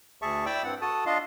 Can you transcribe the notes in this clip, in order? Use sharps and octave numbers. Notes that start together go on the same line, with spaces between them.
D2 G#4 E5 A5 C#6
E4 D5 E5 G5 D6 E6
G2 C4 F#5
F#4 A4 A5 D#6
D4 F4 D#5 F5